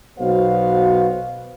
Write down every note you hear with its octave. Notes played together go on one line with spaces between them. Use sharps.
B1 B2 B3 F#4 C5 F5